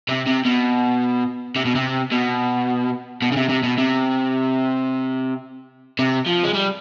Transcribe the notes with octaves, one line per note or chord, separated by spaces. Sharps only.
C3
C3
B2
C3
B2
C3
B2
B2
C#3
C3
C3
B2
C3
C3
F3
G#3
G3